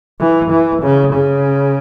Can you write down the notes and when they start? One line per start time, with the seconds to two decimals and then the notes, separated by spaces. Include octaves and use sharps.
0.20 E3
0.51 E3
0.82 C#3
1.13 C#3